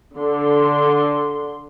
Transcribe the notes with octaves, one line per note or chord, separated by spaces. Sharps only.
D3 C6